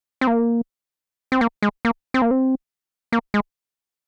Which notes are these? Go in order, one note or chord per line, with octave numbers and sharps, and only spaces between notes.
C4
A#3
C4
A#3
G#3
A#3
C4
A#3
C4
A#3
G#3